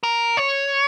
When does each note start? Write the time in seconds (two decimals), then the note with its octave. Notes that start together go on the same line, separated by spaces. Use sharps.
0.03 A#4
0.37 C#5